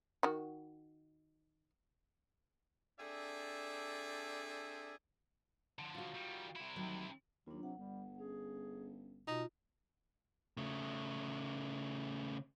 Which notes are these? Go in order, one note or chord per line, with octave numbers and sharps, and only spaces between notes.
D#3 F#4
C4 D4 G#4 A4 D5 E5
D3 F3
F4 F#4
D#3 G3
C3 E4
D2 D#3 F#3
D#2 F#3 D4 F4
C3 F#5
G1 G3
C#4 G#4
B2 D#4 F4
C#3 A3